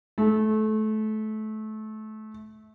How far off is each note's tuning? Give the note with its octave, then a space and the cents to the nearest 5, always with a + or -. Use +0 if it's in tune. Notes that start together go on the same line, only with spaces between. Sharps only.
A3 -25